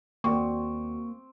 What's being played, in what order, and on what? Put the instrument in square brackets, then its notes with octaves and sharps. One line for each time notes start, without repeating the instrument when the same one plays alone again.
[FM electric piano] D#2 F#4 D5 [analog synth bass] A#3 [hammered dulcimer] C4 [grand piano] C#6